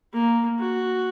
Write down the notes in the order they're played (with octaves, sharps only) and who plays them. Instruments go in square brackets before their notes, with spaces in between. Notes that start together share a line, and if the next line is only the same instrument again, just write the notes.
[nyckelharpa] A#3
F#4